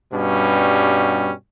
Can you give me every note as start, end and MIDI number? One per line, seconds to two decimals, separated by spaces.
0.13 1.31 43
0.13 1.31 47
0.13 1.31 55
0.13 1.31 61